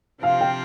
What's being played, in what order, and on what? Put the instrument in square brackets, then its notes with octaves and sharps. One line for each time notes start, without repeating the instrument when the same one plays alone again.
[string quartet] C3 F3 C4 F4 [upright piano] F5
[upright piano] G5